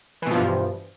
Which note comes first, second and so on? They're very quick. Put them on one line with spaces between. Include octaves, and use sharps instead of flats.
E3 B2 F3 G2